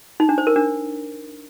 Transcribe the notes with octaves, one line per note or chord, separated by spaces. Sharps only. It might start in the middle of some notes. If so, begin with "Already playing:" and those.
D#4
D4
C5
A#4
D4